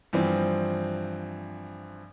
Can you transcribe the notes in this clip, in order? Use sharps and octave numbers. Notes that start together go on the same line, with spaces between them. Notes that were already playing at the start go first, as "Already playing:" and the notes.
G2 E3 F3 C4